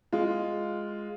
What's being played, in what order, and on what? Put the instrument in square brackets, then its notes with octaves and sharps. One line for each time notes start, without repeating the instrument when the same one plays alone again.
[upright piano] G#3 F4